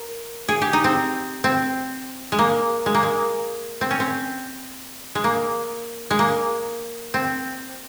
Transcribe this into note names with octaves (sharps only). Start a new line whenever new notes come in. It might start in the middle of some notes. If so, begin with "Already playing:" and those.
Already playing: A#4
G#4
G4
D#4
C4
C4
G#3
A#3
G#3
A#3
G#3
C4
C#4
C4
G#3
A#3
G#3
A#3
C4